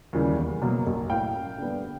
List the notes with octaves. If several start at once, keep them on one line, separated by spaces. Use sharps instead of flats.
D#2 C#3 E3 G3
E2
B2 F#3 A#3
B1
A2 F#3 F5 G5
F#2
D3 G3 B3 D4